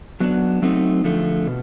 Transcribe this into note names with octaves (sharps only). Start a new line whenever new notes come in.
F#3 B3 D4
F#3 A3 C4 D#4
D3 F3 A3
B2